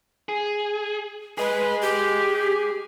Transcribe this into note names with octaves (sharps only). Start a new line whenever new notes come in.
G#4
G#4 B4 D#5
G4